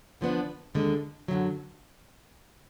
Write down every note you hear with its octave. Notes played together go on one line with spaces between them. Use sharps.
D3 F3 B3 D4
D#2 D3 G#3
F#2 D3 F#3